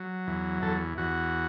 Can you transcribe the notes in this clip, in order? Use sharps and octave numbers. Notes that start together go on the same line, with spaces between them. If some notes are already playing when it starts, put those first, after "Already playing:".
Already playing: F#3
E2
E2 A4
E2 F#4